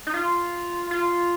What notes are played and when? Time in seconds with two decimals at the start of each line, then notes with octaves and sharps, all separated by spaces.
0.07 D#4
0.14 F4
0.91 F4